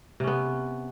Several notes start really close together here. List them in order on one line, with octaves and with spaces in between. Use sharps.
C3 C#4 B3